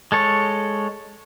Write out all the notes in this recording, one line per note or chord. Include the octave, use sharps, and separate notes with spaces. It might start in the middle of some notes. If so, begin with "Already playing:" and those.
G#3 A4 C#5